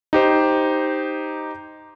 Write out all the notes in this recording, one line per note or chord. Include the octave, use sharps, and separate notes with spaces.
D#4 G4 C5